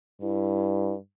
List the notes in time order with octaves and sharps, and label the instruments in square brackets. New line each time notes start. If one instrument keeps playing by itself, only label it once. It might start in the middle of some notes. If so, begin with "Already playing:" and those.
[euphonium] G2 [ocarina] E4